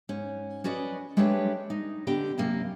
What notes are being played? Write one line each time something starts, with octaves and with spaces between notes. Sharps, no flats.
G#2 C#4
C#4 F#4 B4 D5 D#5
G#3 A3 D4 G4 B4 C#5
D#4
D3 B3 G4 D#5 G5
F#2 C3 A#3